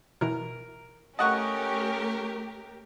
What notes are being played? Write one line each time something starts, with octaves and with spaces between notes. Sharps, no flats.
B2 E3 A#4
A3 C#4 G4 A#4 D#5 F#5 A5 C#6